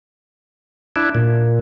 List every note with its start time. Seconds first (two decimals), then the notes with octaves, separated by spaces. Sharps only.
0.96 D4 E4
1.15 A#2